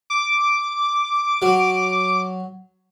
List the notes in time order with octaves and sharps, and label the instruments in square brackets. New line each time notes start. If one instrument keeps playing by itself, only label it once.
[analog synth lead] D6
[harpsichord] F#3